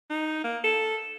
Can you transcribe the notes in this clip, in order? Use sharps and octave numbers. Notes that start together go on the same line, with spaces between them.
D#4
A#3
A4